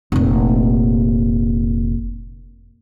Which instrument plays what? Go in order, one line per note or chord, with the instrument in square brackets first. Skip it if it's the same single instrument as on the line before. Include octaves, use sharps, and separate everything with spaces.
[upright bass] F1 A#2